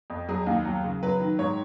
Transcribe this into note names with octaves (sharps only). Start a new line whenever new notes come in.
F2
F#3 G#4
D#2
F#3
C#3
F#3 B4
D#3
G#2 C#5